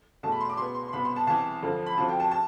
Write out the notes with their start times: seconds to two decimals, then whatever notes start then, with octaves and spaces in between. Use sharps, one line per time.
0.23 E2 B2 A3 A5
0.32 B5
0.40 C6
0.49 D6
0.57 B2 B3 C6
0.75 C6
0.88 C6
0.93 C2 B2 B3 B5
1.05 C6
1.16 A5
1.27 C2 C3 E3 A5
1.62 F2 D3 F3
1.86 B5
1.97 D2 C3 F3 A5
2.09 G5
2.20 A5
2.31 A5